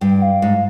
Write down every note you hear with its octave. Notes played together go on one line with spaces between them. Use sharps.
G2 G5
F5
G#2